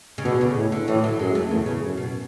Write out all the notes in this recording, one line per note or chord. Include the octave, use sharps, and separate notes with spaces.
C#3
B2 D3
C#3
A2
D3
A2 E3
F#3
F#2 G#3
A3
E2 C#3
C#3
F#2
B2